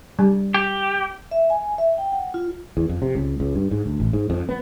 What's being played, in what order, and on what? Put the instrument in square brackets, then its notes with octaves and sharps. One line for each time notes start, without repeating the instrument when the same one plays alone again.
[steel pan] G3
[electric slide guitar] G4
[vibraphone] E5
G#5
E5
G5
F#5
F4
[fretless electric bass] E2
F2
C3
C#2
C#2
G2
G#2
D2
A1
G#2
F2
B3